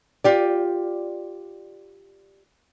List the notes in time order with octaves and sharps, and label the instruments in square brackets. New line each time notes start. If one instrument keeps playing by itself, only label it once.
[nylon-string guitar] F4 G4 D5